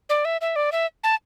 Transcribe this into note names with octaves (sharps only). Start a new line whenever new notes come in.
D5
E5
E5
D5
E5
A5